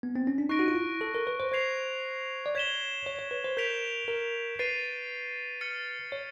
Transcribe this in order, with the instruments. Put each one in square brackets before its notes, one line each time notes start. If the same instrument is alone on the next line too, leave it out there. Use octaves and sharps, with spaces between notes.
[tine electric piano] B3
C4
C#4
D4
[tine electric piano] D#4 [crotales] C#6 F#6 A#6 D7
[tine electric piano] F#4
F4
E4
A4
A#4
B4
C5
[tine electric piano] C5 [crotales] G#6 C7 F7
[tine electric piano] D5
[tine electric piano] C#5 [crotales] G#6 B6 E7 G7
[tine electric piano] C#5
C#5
B4
C5
[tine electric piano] A#4 [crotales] G6 B6 D7 F7
[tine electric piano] A#4
[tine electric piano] B4 [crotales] A6 C7 D#7
[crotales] F6 A6 C#7
[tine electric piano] C#5